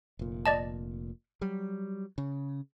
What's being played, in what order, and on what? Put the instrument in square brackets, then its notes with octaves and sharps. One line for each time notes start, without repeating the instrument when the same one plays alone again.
[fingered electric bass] F1 A#2
[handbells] D5 D#5 A5
[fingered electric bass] F#3 G3
C#3